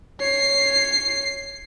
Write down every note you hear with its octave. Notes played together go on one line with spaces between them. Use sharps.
C#5 C7